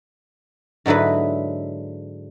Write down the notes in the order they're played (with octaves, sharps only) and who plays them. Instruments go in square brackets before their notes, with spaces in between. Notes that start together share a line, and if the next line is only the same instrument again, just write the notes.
[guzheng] G#2 D3 F#3 E4 B4